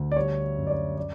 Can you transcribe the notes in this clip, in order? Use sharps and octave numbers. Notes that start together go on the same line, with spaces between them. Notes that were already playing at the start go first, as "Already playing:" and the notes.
Already playing: D2
D5
G3 C#5
F#2
D5
C#5
D5